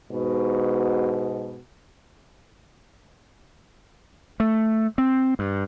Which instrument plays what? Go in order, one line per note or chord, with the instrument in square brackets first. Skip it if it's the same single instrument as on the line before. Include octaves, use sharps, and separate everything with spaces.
[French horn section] G#2 B2
[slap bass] A3
C4
G2